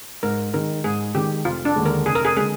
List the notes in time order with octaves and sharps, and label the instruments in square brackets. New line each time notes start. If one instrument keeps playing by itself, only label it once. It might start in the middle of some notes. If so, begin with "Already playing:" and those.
[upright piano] G#2 [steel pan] A#4
[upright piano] D#3 G#3 D#4 [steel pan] A#4
[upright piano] G#2 [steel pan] G#4
[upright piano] D#3 G#3 D#4 [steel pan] G4
[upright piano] F1 [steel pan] F4
[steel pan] D4
[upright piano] D#2 D3 G#3
[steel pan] A#4
[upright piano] F1 [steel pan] G#4
[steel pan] A#4
G#4
[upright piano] D3 G#3 [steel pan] G#4